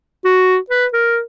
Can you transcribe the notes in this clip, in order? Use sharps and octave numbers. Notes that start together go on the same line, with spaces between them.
F#4
B4
A#4